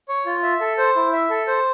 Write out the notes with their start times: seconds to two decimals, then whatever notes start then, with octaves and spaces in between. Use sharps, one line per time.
0.08 C#5
0.26 F4
0.43 E5
0.61 A4
0.78 C5
0.96 E4
1.13 E5
1.30 A4
1.47 C5